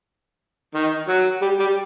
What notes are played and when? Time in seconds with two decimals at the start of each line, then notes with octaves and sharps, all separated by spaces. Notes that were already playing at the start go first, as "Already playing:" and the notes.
0.75 D#3
1.09 F#3
1.42 G3
1.60 G3